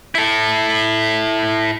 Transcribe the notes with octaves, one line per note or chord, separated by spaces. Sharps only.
E4 A4